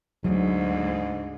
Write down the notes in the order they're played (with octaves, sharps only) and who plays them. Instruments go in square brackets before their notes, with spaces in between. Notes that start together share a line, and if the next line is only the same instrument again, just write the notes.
[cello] D2 [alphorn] G#2 [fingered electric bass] F#3